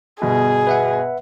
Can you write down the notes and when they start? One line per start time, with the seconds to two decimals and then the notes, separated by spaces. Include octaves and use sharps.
0.22 G1 B2 G#4
0.67 B4 E5 F#5